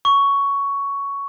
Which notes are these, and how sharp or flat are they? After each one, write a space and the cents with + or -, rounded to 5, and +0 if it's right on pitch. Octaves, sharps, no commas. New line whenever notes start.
C#6 +10